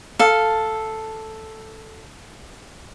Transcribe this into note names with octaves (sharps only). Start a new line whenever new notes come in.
A4 F5